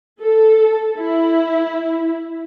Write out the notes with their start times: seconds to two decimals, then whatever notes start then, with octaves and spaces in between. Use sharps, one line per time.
0.20 A4
0.98 E4